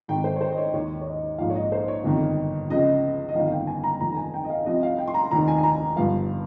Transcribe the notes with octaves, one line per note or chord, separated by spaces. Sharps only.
G#1 G#2 D#3 G5
C5
C#5
C5
D#5
C#5
D#2 D#3 C#5
C#5
D#5
A#1 G#2 F3 F5
C#5
D#5
C5
C#5
G1 F2 C3 D#3
C#2 C#3 F3 D#5
D#5
G1 F2 D#3 F5
F5
G5
G#5
A#5
F1 F2 D#3 A#5
A#5
G#5
G5
D#5
F5
C2 C3 F3 D#5
F5
G5
C6
A#5
F1 D#2 D#3 A#5
G#5
G#5
A#5
G1 G2 F3 F5